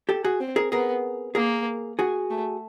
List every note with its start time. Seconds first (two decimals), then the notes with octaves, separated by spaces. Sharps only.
0.09 G4 A4
0.24 F#4 G#4
0.40 C4
0.56 G#4 A#4
0.72 B3 G#4 A#4
1.35 A#3 G#4 A#4
1.99 F#4 G#4
2.30 A3